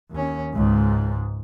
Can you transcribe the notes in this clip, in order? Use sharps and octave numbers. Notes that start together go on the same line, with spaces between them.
D#2 C#4
C#2 G#2